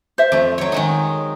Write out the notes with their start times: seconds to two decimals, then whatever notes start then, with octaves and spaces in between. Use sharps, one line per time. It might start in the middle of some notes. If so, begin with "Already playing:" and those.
0.18 C5 E5
0.32 F2 A3
0.58 F#3 C#5
0.72 D#3 G#3 D#4